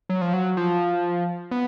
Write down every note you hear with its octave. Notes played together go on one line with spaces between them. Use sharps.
F#3
F3
F#3
F3
B3